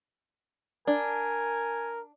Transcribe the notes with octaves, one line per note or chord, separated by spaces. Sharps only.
D4 A#4 G#5